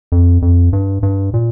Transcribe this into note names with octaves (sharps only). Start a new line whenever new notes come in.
F2
F2
G2
G2
A#2